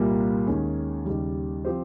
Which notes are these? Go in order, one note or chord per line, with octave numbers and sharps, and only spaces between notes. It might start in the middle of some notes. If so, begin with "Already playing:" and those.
Already playing: C2 A#2 G3 A#3 F4
D#2 D#3 G#3 C#4 G#4
D#2 C#3 G3
F3 C4 G4 C5